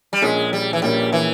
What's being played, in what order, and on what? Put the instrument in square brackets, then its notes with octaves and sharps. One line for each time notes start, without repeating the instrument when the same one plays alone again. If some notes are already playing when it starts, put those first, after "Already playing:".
[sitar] G3
[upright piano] A#1 A#2 A#3 C#4 [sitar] G#3
[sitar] G3
E3
[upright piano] A#1 A#2 A#3 C#4 [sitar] G3
[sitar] E3